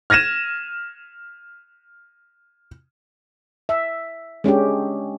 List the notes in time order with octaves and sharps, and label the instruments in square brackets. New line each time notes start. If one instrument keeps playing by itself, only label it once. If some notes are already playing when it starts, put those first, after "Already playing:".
[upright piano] F6 G#6 A#6 D#7 E7
[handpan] E5
G#3 C#4 D4 G4